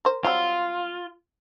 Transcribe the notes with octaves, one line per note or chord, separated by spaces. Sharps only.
A#4 C5
F#3 G3 C4 F4